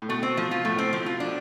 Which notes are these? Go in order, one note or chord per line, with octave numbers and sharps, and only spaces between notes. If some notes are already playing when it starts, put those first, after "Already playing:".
A2
B2 A3
C4
F3
F4
A2 A3
C4
F3
F4
D4